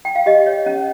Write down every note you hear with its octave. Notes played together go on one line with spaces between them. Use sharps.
G5
F5
G4 D#5
C#5
C#4